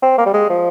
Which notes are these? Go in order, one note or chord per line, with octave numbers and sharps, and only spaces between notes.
C4
A#3
G3
G#3
F3